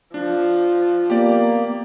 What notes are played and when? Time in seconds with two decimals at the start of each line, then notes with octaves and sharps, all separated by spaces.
0.14 F3 D4
1.10 A#3 B3 G4 D5